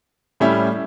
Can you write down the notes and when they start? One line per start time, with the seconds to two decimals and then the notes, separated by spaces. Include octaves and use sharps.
0.40 A2 G3 C#4 E4 G4